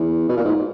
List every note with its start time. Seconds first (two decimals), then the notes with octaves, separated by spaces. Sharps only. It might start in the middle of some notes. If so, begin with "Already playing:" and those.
Already playing: E2
0.29 B2
0.36 A#2
0.45 G#2